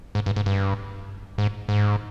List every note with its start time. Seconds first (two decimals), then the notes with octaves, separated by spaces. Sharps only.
0.15 G#2
0.26 G2
0.36 G#2
0.46 G2
1.38 G#2
1.69 G#2